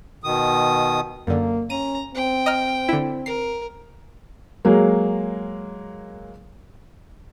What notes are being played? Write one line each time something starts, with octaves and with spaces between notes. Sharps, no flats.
B2 D#3 D#6
F#2 D3 A#3
C#4 A#5 D#7
C4 G5
D#5 A#5 F6
D3 E4
A#4 C7
F#3 G#3 A#3